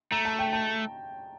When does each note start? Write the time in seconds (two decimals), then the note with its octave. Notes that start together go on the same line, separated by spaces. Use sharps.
0.12 A3 A#5
0.25 A5
0.39 G5
0.53 A5